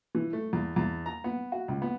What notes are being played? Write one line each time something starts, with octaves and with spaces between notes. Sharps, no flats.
E3
A3
E2
E2
A#5
B3
F#4
C#2
B3